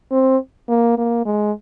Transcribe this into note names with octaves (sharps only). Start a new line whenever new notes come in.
C4
A#3
A#3
G#3